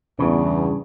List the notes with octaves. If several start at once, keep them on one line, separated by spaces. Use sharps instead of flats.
E2 G2 C#3